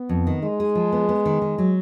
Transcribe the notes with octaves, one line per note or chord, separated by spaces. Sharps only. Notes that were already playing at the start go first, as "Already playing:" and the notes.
Already playing: B3
F2
D#3
G#3 D#4
G#4
F3
B3
B3
D#3
D#3
F#3